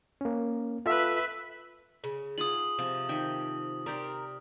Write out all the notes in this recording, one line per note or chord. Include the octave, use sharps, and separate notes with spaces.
A#3 C#4
F4 A4 B4 E5
C#3
F4 G#4 F#5 D#6 F#7
C3 F3
D#3 E5 G5
G4 A#4 C5 D5